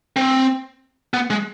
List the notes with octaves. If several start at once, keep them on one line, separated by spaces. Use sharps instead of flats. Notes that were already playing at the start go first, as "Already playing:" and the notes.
C4
B3
G#3